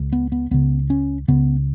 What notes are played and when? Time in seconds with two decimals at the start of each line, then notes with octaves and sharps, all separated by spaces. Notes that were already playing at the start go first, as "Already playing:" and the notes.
Already playing: C#2 C#3
0.13 B3
0.32 B3
0.51 C#2 C#3 B3
0.90 C#4
1.28 C#2 C#3 B3